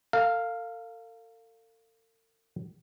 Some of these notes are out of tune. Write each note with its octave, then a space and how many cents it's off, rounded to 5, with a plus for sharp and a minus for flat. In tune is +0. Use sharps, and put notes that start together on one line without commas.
A4 +45 F5 +0